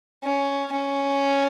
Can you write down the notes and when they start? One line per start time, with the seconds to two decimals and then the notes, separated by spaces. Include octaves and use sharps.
0.24 C#4
0.72 C#4